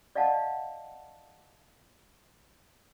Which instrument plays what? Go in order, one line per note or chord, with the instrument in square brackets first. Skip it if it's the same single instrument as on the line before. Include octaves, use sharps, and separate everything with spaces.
[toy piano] D5 D#5 F5 F#5 A5